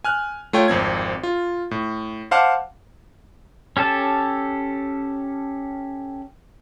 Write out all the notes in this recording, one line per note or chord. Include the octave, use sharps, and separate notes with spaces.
G#5 F6 F#6
A3 F4 C#5 G5
G#1 F2 C4 G#6
F4
A2
C5 F5 F#5 A5 D6
C#4 G4 A4 A5